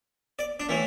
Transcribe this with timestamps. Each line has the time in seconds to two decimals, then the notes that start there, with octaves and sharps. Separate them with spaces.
0.39 D5
0.60 D4
0.69 A2 E3 A3